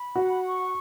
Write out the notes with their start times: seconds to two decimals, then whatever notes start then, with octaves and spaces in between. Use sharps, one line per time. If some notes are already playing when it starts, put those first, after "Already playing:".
Already playing: B5
0.15 F#4 F#5
0.45 C#6